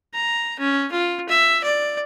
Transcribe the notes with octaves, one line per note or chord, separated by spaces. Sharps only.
A#5
C#4
F4
E5
D5